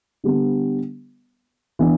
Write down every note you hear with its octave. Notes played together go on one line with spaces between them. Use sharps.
D3 G3 B3
E3 B3 D4